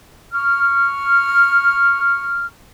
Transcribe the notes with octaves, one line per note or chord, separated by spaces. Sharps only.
C#6 F6